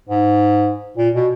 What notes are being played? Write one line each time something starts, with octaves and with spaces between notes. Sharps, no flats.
G#2
A#2
B2